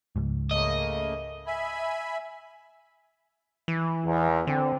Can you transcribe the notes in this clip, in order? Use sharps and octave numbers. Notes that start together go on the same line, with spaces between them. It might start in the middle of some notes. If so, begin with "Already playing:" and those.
C#2 G#2
C#3 A3 A#3 D#5
E5 G#5 B5
E3
E2
D3 C4